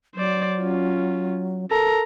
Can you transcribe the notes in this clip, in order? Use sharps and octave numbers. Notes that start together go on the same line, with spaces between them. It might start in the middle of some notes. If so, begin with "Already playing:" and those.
F#3 C5 D5
C#4 F4
A4 A#4 A#5